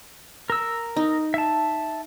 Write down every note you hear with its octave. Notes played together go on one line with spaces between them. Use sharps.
A#4 E6
D#4
E5 A5